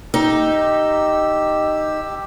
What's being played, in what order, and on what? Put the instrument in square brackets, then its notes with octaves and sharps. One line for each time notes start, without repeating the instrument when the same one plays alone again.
[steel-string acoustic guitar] D#4 [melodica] G4 E6